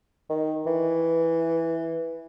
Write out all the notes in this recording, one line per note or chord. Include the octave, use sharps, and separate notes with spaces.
D#3
E3